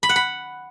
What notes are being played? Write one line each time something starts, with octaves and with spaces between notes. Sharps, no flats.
B5
F#5
B5